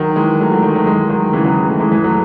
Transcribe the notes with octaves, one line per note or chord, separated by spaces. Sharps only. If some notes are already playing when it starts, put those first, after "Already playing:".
Already playing: D#3 F#3
E3 G#3
F#3 A3
F#3 A3
D#3 F#3
F#3 A3
E3 G#3
D#3 F#3
C#3 E3
D#3 F#3
F#3 A3
E3 G#3
E3 G#3
F#3 A3